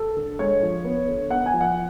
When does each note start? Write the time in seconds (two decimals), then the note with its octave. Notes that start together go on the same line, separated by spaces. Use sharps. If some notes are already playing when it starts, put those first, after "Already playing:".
Already playing: A4
0.17 D3
0.39 G#3 C#5
0.62 F3
0.84 B3
1.08 D3
1.30 B3 F#5
1.46 G#5
1.54 F3
1.61 F#5